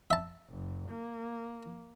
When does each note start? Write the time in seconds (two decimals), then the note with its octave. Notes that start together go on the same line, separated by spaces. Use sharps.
0.11 E5 A5
0.50 F#1
0.90 A#3